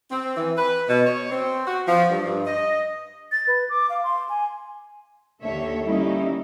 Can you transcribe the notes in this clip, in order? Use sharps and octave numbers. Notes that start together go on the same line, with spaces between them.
C4
E3
B4
B2
C#5
C4
F#4
F3
G2
G2
D#5
A6
B4
D6
F5
C6
G#5
D#2 D3 A4 C#5 E5
D#3 G3 A#3 C#4 D#4 E4